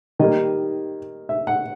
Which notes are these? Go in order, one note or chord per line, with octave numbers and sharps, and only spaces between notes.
D#3 G3 A#3 D#5
E5
F#5